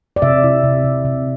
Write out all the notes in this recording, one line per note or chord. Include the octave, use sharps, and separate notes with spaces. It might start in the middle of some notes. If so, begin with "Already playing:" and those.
D5
C3 E5
E4
C3
C3
C3